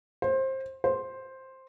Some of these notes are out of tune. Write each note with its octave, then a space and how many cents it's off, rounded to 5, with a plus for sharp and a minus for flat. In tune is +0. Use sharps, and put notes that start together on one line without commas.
C5 +20
C5 +5